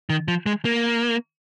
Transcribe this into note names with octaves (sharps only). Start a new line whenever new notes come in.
D#3
F3
G#3
A#3